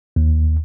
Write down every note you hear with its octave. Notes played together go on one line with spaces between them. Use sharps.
D#2